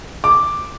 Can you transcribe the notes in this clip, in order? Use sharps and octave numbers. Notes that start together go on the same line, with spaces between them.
D6